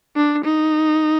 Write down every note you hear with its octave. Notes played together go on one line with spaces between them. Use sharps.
D4
D#4